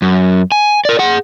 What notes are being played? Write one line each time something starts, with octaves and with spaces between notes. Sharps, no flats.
F#2
G#5
A#4 D5
G#4 F#5